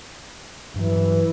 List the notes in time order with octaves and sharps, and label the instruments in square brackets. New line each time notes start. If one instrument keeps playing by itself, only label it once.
[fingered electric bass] G2 F#3 [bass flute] E3